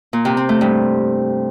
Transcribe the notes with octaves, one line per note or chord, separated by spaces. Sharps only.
A#2
C3
C4
A3
G2